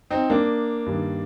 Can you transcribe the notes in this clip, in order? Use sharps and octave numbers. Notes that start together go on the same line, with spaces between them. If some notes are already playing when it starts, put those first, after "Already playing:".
C4 D#4
A#3 D4
G2 D#3